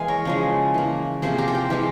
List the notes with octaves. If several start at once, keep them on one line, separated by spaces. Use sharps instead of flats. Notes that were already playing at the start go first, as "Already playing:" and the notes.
Already playing: E3 G#3 A#3 F5 G#5
A#4 C#5
C#3 F3 G#3
E3 A#3
C3 F3 A#3 G#4 C5
G4 A#4
C5
G4 A#4
E3 G#3 G4 A#4